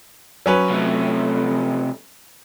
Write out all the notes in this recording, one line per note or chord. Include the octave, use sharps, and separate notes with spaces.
F#3 C#4 B4
C3 A3